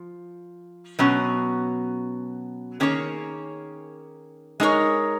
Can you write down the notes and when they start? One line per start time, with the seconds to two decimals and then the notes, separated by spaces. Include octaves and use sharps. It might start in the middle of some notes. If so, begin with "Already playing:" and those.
Already playing: F3
0.99 B2 F#3 C#4
2.80 D#3 A#3 C#4 G#4 C#5
4.60 G#3 D#4 A#4 C#5